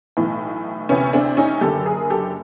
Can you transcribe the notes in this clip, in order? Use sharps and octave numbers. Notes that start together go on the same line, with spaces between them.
B1 A2 E3
D2 C3 E3 B3 C#4
C4 D4
C#4 D#4
F#1 F#2 D3 G4 A4
G#4 A#4
G4 A4